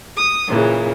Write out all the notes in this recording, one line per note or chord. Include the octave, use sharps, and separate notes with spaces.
D#6
A#2 C#3 E3